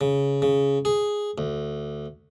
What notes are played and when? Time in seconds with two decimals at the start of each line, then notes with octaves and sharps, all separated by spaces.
0.01 C#3
0.42 C#3
0.85 G#4
1.38 D2